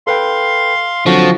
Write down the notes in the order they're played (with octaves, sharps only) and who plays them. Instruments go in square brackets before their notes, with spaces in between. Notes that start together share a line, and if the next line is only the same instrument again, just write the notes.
[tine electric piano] A4 B4 G5 [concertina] F5 C6
[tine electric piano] D3 F#3 C4 [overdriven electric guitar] F3 [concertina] F#4